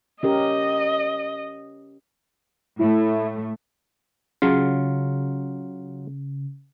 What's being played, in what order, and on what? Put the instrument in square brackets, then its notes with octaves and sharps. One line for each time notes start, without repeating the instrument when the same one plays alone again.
[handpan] C#4 G4 A#4 [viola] D#5
[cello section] A2 A3 [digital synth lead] E4
[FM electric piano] C#3 [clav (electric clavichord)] F#3 F4